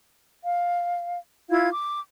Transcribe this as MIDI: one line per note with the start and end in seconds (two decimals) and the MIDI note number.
0.44 1.18 77
1.49 1.69 64
1.49 1.69 65
1.49 1.69 77
1.49 1.69 92
1.71 2.01 86